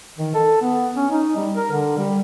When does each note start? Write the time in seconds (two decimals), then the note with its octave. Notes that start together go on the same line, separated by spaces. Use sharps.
0.19 D#3
0.34 A4
0.62 B3
0.97 C#4
1.11 D#4
1.36 G3
1.56 A#4
1.71 D3
1.98 G3